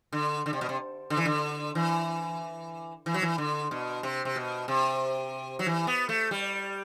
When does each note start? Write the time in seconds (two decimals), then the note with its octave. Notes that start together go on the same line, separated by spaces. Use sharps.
0.13 D3
0.46 D3
0.53 C3
0.61 B2
0.69 C3
1.10 D3
1.17 E3
1.25 D3
1.75 E3
3.06 E3
3.14 F#3
3.22 E3
3.38 D3
3.71 B2
4.03 C3
4.25 C3
4.36 B2
4.68 C3
5.59 F#3
5.66 E3
5.87 B3
6.09 A3
6.31 G3